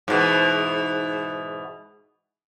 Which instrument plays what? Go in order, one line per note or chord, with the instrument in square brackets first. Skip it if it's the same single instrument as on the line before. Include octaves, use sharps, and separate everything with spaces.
[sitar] G#2 B2 E3